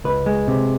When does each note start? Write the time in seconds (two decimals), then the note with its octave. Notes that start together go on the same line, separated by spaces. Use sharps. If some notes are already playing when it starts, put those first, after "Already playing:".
0.04 C#2 B4
0.26 G#3
0.48 C3